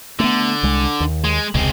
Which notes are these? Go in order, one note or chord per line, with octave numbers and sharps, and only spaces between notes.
D3 A3 B3
C2 G#3
D#2
G#3
E1 C#2 C3 G#3 C4